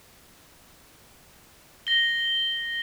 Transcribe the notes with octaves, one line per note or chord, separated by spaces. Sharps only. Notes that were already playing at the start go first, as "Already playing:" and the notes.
A#6 G7